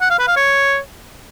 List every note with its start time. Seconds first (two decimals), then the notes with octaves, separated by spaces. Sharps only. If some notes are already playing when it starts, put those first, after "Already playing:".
0.01 F#5
0.10 F5
0.19 B4
0.27 F5
0.36 C#5